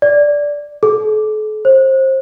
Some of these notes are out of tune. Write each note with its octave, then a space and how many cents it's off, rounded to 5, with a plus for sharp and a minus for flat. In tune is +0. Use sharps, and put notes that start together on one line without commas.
D5 -5
A4 -45
C5 +25